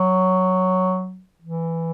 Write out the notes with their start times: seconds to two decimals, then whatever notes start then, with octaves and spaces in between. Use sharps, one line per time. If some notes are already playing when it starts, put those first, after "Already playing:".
Already playing: F#3
1.42 E3